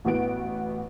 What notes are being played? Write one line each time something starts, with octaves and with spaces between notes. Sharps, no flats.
A1 E3 B3 F#4 D7